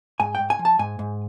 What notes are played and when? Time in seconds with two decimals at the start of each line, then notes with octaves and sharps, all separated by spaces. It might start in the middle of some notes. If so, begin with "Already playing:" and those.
0.20 G#2 G#5
0.35 G#2 G5
0.50 G#5
0.59 F3
0.65 A5
0.79 G#2 G#5
0.99 G#2